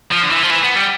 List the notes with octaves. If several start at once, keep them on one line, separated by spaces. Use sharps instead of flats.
F3
D3
E3
F3
E3
B3
G3